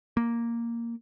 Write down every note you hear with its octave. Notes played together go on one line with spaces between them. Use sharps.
A#3